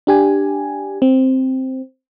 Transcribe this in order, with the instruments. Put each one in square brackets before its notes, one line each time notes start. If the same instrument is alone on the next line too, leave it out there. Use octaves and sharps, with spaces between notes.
[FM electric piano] D4 G4 G#5
C4